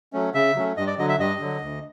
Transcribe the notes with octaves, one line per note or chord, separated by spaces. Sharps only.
F#3 A3 C#4
C#3 E5
F#3 A3 C#4
G2 D#5
D5
D3 F#3 D#5
E5
G2 D#5
D3 F#3
D2